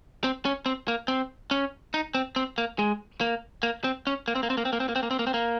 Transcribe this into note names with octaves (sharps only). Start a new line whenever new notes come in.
C4
C#4
C4
A#3
C4
C#4
D#4
C4
C4
A#3
G#3
A#3
A#3
C4
C#4
A#3
C4
A#3
C4
A#3
C4
A#3
C4
A#3
C4
A#3
C4
A#3
C4
A#3